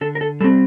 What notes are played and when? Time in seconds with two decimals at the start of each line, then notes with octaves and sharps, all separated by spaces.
0.01 D3 A4
0.15 A#4
0.21 A4
0.41 G3 A4
0.44 C4